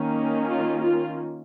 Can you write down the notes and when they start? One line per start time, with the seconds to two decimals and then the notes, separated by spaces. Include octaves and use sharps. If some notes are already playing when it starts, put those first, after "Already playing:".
Already playing: D#3 A#3 C#4
0.49 F4
0.83 F4